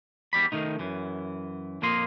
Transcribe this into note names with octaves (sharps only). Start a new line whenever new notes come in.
E2 G3 D5 B5
D#3 A3 D#4
F#2 E3
F2 A#2 A#3 D#5 C6